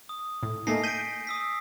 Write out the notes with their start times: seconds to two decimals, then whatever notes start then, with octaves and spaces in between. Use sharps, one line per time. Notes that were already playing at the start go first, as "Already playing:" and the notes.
0.09 D#6
0.43 A2
0.67 A3 A#3 D#4 G#5 A#6 C7
0.83 G6 B6 D7 D#7
1.27 D#6 E6 B6